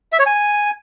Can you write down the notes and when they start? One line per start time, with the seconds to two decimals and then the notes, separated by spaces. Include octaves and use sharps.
0.12 E5
0.19 C#5
0.26 G#5